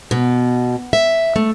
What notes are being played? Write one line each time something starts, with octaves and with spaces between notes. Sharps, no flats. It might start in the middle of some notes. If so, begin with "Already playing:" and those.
B2
E5
A3